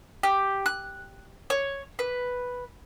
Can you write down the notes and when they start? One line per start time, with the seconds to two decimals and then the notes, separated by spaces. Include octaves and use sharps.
0.23 G4
0.66 F#6
1.50 C#5
1.99 B4